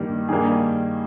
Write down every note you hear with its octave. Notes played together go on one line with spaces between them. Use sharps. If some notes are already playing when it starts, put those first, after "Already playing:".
Already playing: G2 D#3 G3 A#3
G2 D#3 G3 A#3 G#4